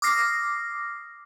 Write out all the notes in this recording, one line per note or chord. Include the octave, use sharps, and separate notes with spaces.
D6 D#6 F6 A#6 C7